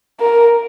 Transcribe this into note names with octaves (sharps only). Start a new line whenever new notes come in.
A#4